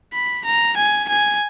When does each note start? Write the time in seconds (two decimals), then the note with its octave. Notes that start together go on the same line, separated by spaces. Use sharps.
0.13 B5
0.45 A#5
0.77 G#5
1.09 G#5